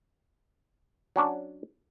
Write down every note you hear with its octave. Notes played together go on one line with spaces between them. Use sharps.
F#3 C#4 D4